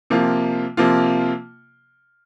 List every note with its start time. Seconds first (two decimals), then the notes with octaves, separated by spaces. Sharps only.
0.10 C3 F3 A#3 F4
0.77 C3 F3 A#3 F4